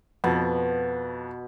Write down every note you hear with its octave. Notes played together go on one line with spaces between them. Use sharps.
F2 B2